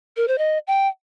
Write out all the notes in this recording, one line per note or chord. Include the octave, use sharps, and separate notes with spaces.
A#4
C5
D#5
G5